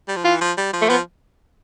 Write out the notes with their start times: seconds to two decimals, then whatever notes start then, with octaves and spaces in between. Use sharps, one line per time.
0.08 G3
0.16 F3
0.25 E3 F4
0.41 F3
0.57 G3
0.73 F3
0.82 A3
0.89 F3 B3